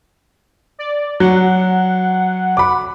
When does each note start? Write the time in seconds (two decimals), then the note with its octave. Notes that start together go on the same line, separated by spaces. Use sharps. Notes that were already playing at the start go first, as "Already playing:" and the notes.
0.79 D5
1.20 F#3 F#5
2.57 B5 D6